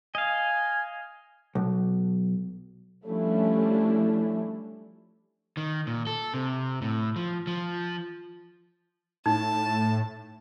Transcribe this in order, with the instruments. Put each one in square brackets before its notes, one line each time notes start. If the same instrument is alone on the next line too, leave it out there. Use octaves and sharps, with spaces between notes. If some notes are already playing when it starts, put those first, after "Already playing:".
[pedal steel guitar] D#5 F5 [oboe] G#5
[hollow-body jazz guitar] B1
[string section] F3 G3 A3 C#4 D4 E4
[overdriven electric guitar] D#3
A#2
A4
C3
A2
F3
F3
[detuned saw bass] A2 [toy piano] D#4 [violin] A5